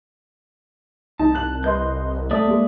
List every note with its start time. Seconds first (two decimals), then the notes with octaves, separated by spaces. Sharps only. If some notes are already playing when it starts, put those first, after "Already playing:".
1.19 C2 D#4 A5
1.35 F#6 F#7
1.64 B4 D#5 C6 G6
2.31 A3 D5 E5 A5 D#6
2.47 G#3 A#3